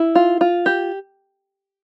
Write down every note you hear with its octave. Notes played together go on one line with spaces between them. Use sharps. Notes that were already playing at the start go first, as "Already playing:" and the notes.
Already playing: E4
F4
F4
G4